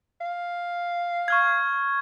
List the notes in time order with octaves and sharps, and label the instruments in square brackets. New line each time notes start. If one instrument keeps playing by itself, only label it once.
[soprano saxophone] F5
[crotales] C#6 F6 G#6